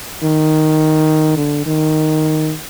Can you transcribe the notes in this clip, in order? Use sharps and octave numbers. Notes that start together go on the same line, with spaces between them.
D#3
D3
D#3